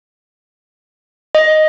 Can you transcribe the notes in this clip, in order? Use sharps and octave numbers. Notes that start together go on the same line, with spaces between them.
D#5